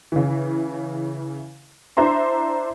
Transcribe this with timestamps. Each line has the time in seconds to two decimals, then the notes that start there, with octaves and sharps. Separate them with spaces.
0.12 C#3 E3
1.97 D4 E4 C5 E5 A#5 C6